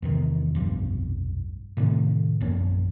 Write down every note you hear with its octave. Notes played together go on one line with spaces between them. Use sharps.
E2 C3 D#3
F1 B1 G2
A2 C3 D#3 A3
A#1 F#2 A#3 C#4